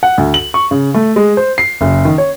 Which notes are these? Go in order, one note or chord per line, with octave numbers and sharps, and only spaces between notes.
F#5
D2
F#7
C#6
C#3
A3
G#3
C5
C7
F#1
D#3
C#5